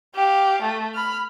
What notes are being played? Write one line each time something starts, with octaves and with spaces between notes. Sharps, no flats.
G4 F5
A3
B5 F6